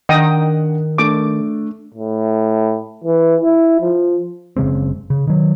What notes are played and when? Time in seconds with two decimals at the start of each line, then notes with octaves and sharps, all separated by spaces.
0.09 D#3 D4 D#5 F#5 G5 D#6
0.98 A3 D4 D6
1.94 A2
3.04 E3
3.41 E4
3.80 F3
4.56 F#1 C#3 G#3 C4
5.10 C#3
5.27 D#3 F#3